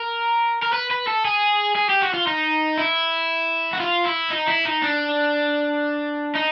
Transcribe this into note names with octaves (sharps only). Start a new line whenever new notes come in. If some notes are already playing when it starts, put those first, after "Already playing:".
Already playing: A#4
A#4
B4
B4
A4
G#4
G#4
G4
F#4
F4
D#4
E4
F#4
F4
E4
D#4
E4
D#4
D4
D#4